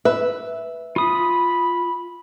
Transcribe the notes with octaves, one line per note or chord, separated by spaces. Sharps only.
B4 E5
F4 B5 D#6